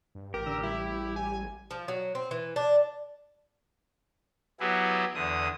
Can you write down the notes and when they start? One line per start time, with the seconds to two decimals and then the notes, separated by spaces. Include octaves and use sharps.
0.15 G2
0.34 A1 G4 A#4
0.46 D3 E6
0.63 G3 E4
1.16 G#5
1.71 F3
1.88 F#3
2.15 C4
2.31 E3
2.56 D4
4.60 F#3 B3 E4 G4 G#4
5.14 E2 D3 D#6